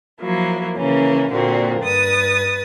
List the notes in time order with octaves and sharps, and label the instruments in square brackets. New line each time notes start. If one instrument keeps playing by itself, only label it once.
[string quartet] F3 F#3 A#3 E4
C#3 E3 A#3 C#4
A#2 D3 A#3 C4 F#4
G2 B4 D#6 A6